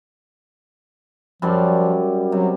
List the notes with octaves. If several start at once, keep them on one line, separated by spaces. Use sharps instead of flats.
F#2 F3 G3 D5
C3 F#3